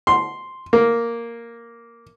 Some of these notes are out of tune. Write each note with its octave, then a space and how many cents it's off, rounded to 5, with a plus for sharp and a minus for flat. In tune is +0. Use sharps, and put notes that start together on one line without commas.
C6 +0
A#3 +0